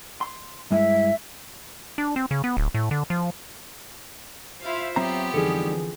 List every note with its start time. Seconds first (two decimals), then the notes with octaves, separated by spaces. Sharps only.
0.21 C6
0.72 G2 G#3 E4 E5
1.98 D4
2.16 C4
2.31 C#3
2.44 B3
2.57 D1
2.74 A2
2.91 D3
3.10 F3
4.61 E4 F4 C5 E5 F5
4.96 F#3 B3 C4 G4 A#5
5.34 F2 D3 E3 G3 D#4 G#4 A4